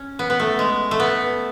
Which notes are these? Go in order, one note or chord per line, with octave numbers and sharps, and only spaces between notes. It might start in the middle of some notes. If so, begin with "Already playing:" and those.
Already playing: C#4
B3
B3
A3
G#3
A3
B3